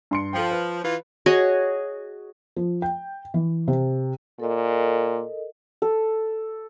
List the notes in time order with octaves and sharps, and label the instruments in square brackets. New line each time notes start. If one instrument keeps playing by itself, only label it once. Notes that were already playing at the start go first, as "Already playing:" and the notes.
[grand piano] G2 C6 C#7
[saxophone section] F3 [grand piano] A4 G5
[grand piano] B4
[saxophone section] E3 F4
[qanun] F#4 G#4 C#5 D#5
[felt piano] F3
G5
E3
C3
[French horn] A#2 [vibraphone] A4 A#4 D#5
[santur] A4